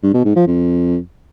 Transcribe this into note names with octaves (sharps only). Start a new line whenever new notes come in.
G2
B2
G#2
F3
F2